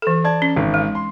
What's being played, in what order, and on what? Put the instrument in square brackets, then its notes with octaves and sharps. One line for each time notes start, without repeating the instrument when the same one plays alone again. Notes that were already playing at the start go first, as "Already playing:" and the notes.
[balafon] E3 A4
[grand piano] D5 A5 G#6
[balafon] C#4
[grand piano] G#1
[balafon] G#3
[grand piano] C6